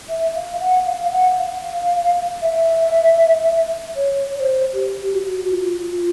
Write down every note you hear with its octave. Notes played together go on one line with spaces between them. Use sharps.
E5
F5
F#5
F5
F#5
F5
E5
C#5
C#5
C5
G4
F#4
F4
F4